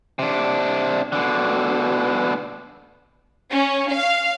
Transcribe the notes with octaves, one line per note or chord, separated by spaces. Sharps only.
C3 D4
B2 D3
C#4
F5